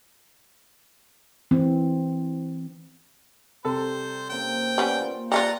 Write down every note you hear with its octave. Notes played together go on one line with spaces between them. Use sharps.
E3 C4
C3 G3 A4 C5
C#3 A#3 C4 G5
G3 B3 C#4
A#3 F4
G3 D#4 F4 B4 F#5 A#5